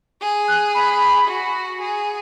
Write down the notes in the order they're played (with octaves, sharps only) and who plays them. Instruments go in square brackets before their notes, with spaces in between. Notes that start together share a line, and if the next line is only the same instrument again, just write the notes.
[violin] G#4
[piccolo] F#6
B5
[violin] F#4
G#4